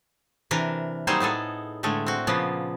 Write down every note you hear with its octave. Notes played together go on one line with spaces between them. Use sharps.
C3 E3 D4 A#4
F#3 G3 A#3 D#4 G#4 C5
A2 B3 G#4 A4
A2 D3 G#3 A3
C4 F#4
A#2 C#3 F3 A#3 B3